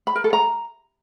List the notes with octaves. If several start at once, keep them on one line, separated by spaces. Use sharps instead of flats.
B5
A#4
A4
A#5